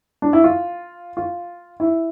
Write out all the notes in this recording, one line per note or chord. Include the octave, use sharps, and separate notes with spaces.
D4
E4
F4
F4
E4